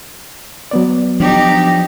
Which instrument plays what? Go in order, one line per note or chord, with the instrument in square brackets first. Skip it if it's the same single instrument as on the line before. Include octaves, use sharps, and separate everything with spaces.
[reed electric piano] F#3 B3 D5
[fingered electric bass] F3 D4 [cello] D#4 G4